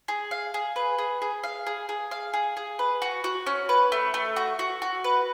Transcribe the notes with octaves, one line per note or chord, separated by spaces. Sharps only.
G#4
F5
G#4
B4
G#4
G#4
F5
G#4
G#4
F5
G#4
G#4
B4
F#4
F#4
C#4
B4
A3
A3
F#4
F#4
F#4
B4